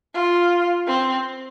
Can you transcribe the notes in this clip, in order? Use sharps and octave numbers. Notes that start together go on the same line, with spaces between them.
F4
C4